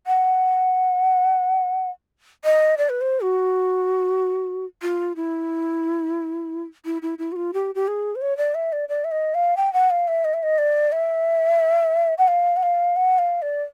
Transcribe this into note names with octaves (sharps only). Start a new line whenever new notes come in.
F#5
D#5
D5
B4
C5
F#4
F4
E4
E4
E4
E4
F#4
F4
G4
G4
G#4
C5
C#5
D5
E5
D5
D5
E5
D#5
F5
G5
F#5
F5
E5
D#5
E5
D#5
D5
E5
F#5
F5
F#5
F5
F#5
F5
D5